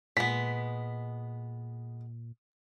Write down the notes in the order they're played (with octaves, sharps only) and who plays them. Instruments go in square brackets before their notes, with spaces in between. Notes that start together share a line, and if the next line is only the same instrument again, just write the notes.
[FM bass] A#2 [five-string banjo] G#3 B3 [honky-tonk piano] B6